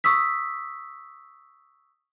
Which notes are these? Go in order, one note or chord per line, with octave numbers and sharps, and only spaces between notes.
C#6 D#6 E6 B6